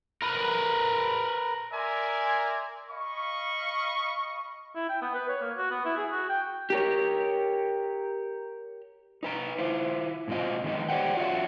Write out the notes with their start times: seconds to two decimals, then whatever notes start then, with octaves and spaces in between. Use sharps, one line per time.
0.22 A#4 B4
1.72 A#4 D5 E5 G#5 A#5 C6
2.89 D#5 F5 B5 C#6
4.75 E4
4.89 G5
5.02 B3
5.15 B4
5.29 C#5
5.41 A#3
5.57 F#4
5.71 B3
5.85 E4
5.97 G#4
6.11 F#4
6.29 G5
6.70 G4 A#4 C#5
9.23 D#4 B4 A#5
9.58 E4 F4 C5
10.28 G#2 B2 C4 F4 D#5
10.64 D#3 G#3 B3 D#4
10.89 G4 C5 D5 F#5 G5
11.17 F4 F#4 C#5 D5 E5 F#5